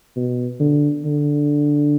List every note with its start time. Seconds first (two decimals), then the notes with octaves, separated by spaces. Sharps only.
0.16 B2
0.60 D3
1.05 D3